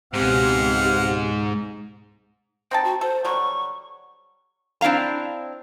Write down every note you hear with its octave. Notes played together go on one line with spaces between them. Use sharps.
C#2 G#2 B2 C4 G4 F5 F#5
C4 D#4 G5 A5
F#4
A4 C5
D3 F#3 G3 C#6
C4 D4 E4 F5 A#5